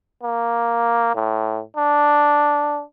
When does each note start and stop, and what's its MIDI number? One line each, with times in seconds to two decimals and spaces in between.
0.23 1.12 58
1.15 1.61 45
1.77 2.82 62